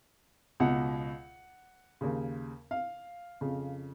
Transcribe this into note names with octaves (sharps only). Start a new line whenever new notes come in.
C#2 B2 F#5
D#2 C#3
F5
F2 C#3